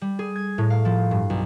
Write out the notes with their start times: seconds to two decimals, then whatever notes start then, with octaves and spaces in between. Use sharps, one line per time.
0.01 G3
0.19 G#4
0.36 G#6
0.58 A2
0.70 F5
0.85 F3
1.11 G2
1.30 B1